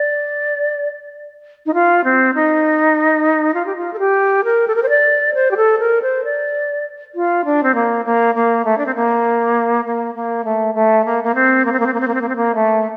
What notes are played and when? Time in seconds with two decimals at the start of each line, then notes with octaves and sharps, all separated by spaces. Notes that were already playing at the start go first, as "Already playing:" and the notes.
Already playing: D5
1.66 D#4
1.74 F4
2.04 C4
2.34 D#4
3.54 F4
3.66 G4
3.76 F4
3.93 A4
3.99 G4
4.44 A#4
4.68 A4
4.76 A#4
4.83 C5
4.89 D5
5.34 C5
5.51 G4
5.57 A4
5.79 A#4
6.02 C5
6.25 D5
7.15 F4
7.45 D4
7.63 C4
7.75 A#3
8.05 A#3
8.35 A#3
8.65 A3
8.78 D4
8.86 C4
8.95 A#3
9.85 A#3
10.15 A#3
10.45 A3
10.75 A3
11.05 A#3
11.24 A#3
11.35 C4
11.65 A#3
11.72 C4
11.80 A#3
11.86 C4
11.94 A#3
12.00 C4
12.08 A#3
12.14 C4
12.21 A#3
12.29 C4
12.36 A#3
12.55 A3